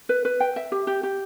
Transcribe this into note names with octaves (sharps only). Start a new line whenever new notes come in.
B4
B4
G5
E5
G4
G4
G4